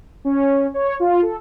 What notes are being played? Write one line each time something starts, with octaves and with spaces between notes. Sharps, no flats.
C#4
C#5
F4
A4